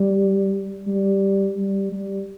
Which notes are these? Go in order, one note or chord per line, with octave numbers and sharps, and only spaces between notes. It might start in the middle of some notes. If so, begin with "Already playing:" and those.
Already playing: G3
G3
G3
G3